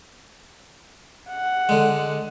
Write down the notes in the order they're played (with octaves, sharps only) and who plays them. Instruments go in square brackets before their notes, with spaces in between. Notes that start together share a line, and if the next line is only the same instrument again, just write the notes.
[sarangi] F#5
[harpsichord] D3 G#3